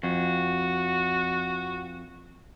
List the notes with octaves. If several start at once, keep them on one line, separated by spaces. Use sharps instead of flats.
F2 F#4